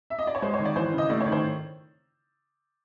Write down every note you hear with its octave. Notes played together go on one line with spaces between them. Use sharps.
E5
D#5
D5
C#5
G#3 C5
C#5
D#3
D5
E3 C5
C#3
D#5
A3 D5
C#5
D#3
C5